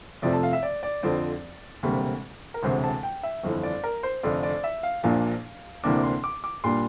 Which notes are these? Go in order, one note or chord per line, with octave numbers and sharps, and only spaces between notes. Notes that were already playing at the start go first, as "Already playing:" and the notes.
F2 C3 F3 A3 D5
A5
F5
E5
D5
D5
F2 D3 F3 C4 D5
E1 D2 C3 G3 A#3
A#4
E1 D2 C3 C5
A5
G5
E5
G1 F2 E3
D5
A#4
C5
F1 F2 D3 D5
D5
E5
F5
A#1 A#2 F3 A#3 D4 F5
D2 C3 E3 A#3 D4 D6
D6
C6
D6
D6
A#2 G3 A#3 D4 C6